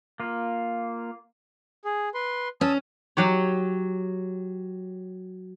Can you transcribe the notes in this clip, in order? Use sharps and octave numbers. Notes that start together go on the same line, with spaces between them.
A#3 F4
G#4
B4 C6
C#4 A5 D#6 E6
F#3 G4 C#5